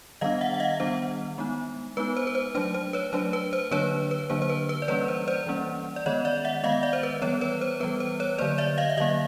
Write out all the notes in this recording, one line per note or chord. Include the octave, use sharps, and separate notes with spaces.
D#3 G3 B3 D4 D#5 F5
E5 F#5
F#5
D#5 F5
D#3 G3 B3 D4 C5
G#3 B3 D#4
G#3 B3 D#4 B4
C5
B4
C5
F#3 A3 D4 C5
C5
B4 C#5
F#3 A3 D4 C5
B4
C5
D3 F#3 A#3 D4 B4 C#5
B4
D3 F#3 A#3 D4 C5
C5
B4
B4
D5
E3 G3 A#3 C#4 B4 C#5
C5
C5 D5
E3 G3 A#3 C#4
D5
D#3 G#3 B3 C#5 D#5
D5 E5
E5 F#5
D#3 G#3 B3 D#5 F5
D5 E5
C5
B4
E3 G3 B3 B4 C#5
B4 C#5
C5
E3 G3 B3 B4
C5
B4 C#5
D3 F#3 A#3 C5 D5
D5 E5
D#5 F5
E5
D3 F#3 A#3 D#5 F5